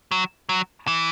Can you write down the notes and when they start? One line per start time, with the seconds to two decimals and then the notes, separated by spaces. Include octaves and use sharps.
0.11 F#3
0.49 F#3
0.87 E3